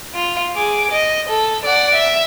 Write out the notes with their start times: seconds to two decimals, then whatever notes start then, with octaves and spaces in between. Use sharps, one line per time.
0.15 F4
0.56 G#4 D6
0.91 D#5
1.30 A4
1.65 D5 F#5
1.95 E5